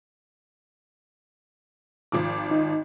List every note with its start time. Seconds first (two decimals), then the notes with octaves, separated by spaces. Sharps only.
2.12 G#1 F3 D6
2.51 D#4